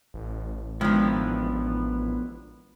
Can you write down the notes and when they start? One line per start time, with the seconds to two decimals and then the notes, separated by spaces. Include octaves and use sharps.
0.14 A1
0.81 D#3 F3 G#3 B3 D4 E4